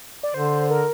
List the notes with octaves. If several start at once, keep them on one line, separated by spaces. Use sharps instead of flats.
D5
D3 C5
A#4